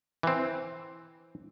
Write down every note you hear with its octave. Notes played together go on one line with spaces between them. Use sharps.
E3 C4